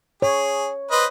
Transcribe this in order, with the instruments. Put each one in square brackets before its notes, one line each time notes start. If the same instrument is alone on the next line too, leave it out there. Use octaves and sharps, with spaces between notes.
[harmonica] G#4 [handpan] C#5
[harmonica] B4 C5 D#5